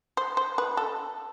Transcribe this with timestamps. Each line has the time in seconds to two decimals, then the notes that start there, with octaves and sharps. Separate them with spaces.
0.17 C5
0.37 C5
0.58 B4
0.77 A4